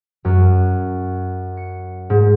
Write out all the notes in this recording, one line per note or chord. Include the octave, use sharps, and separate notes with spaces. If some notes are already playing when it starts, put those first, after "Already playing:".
F#2
C#7
G#2